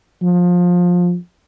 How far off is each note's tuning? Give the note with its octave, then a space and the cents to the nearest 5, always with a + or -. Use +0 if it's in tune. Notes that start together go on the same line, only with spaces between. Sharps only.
F3 +20